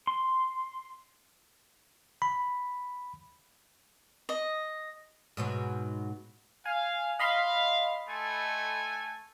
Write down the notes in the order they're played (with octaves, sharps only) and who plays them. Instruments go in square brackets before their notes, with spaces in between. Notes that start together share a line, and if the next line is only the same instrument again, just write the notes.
[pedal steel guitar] C6
[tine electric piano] B5
[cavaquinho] D#5
[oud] G#2 B2 F#3
[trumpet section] F5 [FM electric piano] G#5
[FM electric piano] D#5 B5 C6 [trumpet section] F5
[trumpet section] A3 A4 G#5